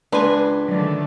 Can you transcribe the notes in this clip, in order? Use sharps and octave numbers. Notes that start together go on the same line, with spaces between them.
C#2 D4 B4 G#5 C6
D3 D#3 F#3 A3 D5